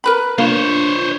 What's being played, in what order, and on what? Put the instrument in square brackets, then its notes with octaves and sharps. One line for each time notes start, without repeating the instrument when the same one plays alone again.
[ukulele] A#4 B4 B5
[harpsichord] A#3 [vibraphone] D4 F4 [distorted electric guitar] C5 C#5